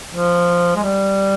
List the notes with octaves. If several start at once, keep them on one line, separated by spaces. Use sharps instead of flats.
F3
G#3
G3